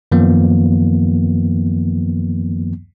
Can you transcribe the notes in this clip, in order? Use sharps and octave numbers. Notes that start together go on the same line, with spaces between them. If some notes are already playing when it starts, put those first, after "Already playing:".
F#2 D#3 F3 A#3 B3